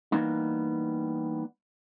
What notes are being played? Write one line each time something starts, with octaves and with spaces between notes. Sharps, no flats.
E3 G3 A#3 B3 D#4